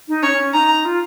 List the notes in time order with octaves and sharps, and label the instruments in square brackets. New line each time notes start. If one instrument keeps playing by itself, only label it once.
[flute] D#4
[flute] C#4 [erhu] C#5
[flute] C#4
[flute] D#4 [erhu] A#5
[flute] F4